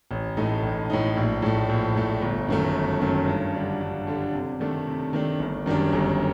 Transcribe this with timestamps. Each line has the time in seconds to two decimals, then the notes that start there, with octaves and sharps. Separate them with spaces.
0.11 A1
0.37 A2 A3 D#4
0.63 A1
0.90 A2 A3 D#4
1.17 A#1
1.42 A2 A3
1.69 A#1
1.96 A2 A3
2.22 G1
2.49 F#2 D#3 A3
2.75 G1
3.02 F#2 D#3 A3
3.28 G2
3.54 D3 G3 D4
3.81 G2
4.07 D3 G3 D4
4.34 C3
4.60 D#3 A3 D4
4.87 C3
5.13 D#3 A3 D4
5.39 G1
5.66 F#2 D#3 G3 D4
5.92 G1